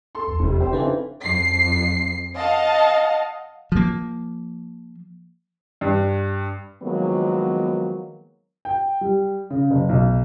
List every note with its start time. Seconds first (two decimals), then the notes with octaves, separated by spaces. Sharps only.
0.15 A4 C6
0.28 E2
0.39 F1 F2 C3
0.60 G4 C5
0.73 F2 C#3 E3 C4 D4 D#4
1.22 F2 C7
2.37 D#5 F5 F#5 A5
3.72 F3 A#3
5.81 G2
6.82 D#3 F3 F#3 G#3 A#3 B3
8.65 G5
9.01 G3
9.50 C#3
9.71 F#1
9.89 B1